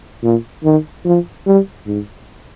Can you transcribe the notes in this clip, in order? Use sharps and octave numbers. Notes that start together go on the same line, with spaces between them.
A#2
D#3
F3
G3
G#2